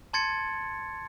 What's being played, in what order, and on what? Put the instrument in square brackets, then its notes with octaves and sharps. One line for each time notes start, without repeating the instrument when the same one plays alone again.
[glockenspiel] A5 C6 G#6 A6 C#7